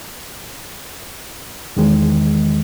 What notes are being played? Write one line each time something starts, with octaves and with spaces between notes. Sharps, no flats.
E2 D#3 G#3